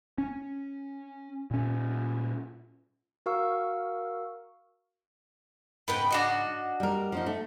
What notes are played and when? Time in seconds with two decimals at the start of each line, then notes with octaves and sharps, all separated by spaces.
0.18 C#4
1.51 A#2 C#4
3.26 F#4 A#4 F5 C#6 E6
5.88 G#2 C#3 B3 B4 G5
6.11 D4 F#4 D#5
6.80 G3 A#4
7.12 F3 C#4 D#4
7.26 A3